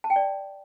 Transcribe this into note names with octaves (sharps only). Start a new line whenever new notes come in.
A5
G5
D5